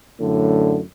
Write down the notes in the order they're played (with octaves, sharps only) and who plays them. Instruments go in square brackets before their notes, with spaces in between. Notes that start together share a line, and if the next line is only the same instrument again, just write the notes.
[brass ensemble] F#2 A2 D3